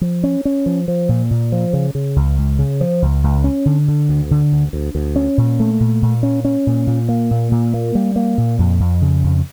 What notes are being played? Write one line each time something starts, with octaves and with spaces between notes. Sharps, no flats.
F3
C#4
C#4
F3
F3
A#2
A#2
F3
C#3
C#3
C#2
C#2
C#3
F3
C#2
C#2
C#4
D3
D3
D2
D3
D2
D2
D2
C#4
A#2
A3
A#2
A#2
C#4
C#4
A#2
A#2
A#3
A#2
A#2
A#3
G3
A#3
A#2
F2
F2
C#3
F2